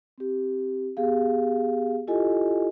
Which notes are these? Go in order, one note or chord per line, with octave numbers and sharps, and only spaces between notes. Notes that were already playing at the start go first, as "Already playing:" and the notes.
C4 G4
B3 G4 G#4 F5
E4 F4 G4 A4 D#5 G#5